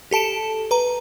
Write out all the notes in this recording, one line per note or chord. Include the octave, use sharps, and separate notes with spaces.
G4 A4 A5 D7 E7
B4 A#5